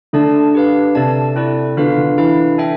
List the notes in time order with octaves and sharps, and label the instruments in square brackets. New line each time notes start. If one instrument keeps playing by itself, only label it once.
[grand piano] D3 [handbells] A3 D4 A4 D5 A5
[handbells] G4 B4 F5
[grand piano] C3 [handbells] D4 A4 D5 A5
[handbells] C4 E4 A4 D5
[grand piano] D3 [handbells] B3 F4 B4 F5
[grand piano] D3
[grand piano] E3 [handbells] E4 B4 F5
[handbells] D4 A4 E5 G5